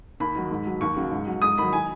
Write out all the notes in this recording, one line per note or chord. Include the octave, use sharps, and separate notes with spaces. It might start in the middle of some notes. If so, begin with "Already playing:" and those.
D#2 B5
D#3 F#3
G#2
F#3
D#2 C#6
C#3 F#3
G#2
F#3
G#2 D#6
D#3 F#3 B5
G#5